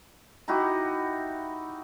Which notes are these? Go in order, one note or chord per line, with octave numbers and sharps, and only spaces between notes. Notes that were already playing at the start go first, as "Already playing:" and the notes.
D#4 E4 F#4 G4